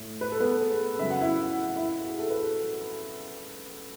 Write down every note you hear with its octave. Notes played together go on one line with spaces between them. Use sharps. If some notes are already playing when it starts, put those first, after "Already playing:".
Already playing: A2
B4
A4
B3 B4
G#4
C#3 F#3 E5
F#5
E4 E5
E4 E5
G#4
A4
B4